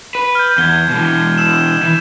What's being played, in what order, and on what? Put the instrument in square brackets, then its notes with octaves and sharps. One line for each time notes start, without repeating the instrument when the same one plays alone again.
[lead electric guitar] B4
[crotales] F6 G6
[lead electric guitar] E2 [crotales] G#6 G7
[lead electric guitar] B2 E3
[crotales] E6 E7
[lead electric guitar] E3